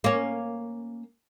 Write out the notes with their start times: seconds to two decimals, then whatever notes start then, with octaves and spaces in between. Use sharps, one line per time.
0.04 A#3 C#4